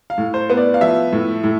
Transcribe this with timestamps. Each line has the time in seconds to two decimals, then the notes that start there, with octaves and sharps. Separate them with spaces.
0.10 F5
0.18 A2
0.34 C5
0.50 B3
0.57 D5
0.74 F5
0.81 F3 E5
1.12 A2
1.44 A2